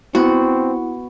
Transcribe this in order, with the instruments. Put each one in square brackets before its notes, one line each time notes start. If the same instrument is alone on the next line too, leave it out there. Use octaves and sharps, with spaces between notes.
[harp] B3 [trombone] C4 [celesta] E4 [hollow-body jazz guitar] F#4